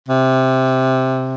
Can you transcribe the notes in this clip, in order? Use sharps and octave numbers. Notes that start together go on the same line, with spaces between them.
C3